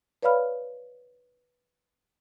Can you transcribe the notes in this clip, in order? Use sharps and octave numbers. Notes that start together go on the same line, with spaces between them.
B4 C#5 D5 F5 B5 F6